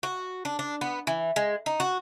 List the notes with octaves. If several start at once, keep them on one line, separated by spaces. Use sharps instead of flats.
F#4
D4
D4
B3
E3
G#3
D#4
F#4